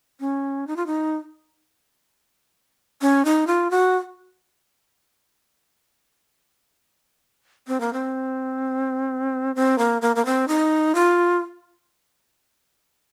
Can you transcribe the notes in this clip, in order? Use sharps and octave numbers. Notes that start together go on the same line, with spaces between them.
C#4
D#4
F4
D#4
C#4
D#4
F4
F#4
C4
A#3
C4
C4
A#3
A#3
A#3
C4
D#4
F4